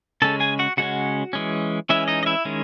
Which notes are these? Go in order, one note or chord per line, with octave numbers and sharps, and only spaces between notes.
C#3 G#3 C#4 A4 A5
G#4 G#5
F#4 F#5
C#3 G#3 C#4 F#4 F#5
E3 G#3 C#4
E3 G#3 C#4 E4 E5
D#4 D#5
D#5
E4 E5
D#3 G#3 C#4